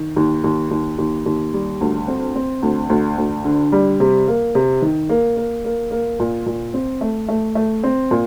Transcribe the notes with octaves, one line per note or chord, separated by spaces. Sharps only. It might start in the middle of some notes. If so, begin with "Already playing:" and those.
Already playing: D#3
D#2
D#2
D#2
D#2
D#2
G3
D2
C4
C4
D2
D2
D2
D3
G3
C3
A#3
C3
D#3
A#3
A#3
A#3
A#3
A#2
A#2
C4
A3
A3
A3
C4
A#2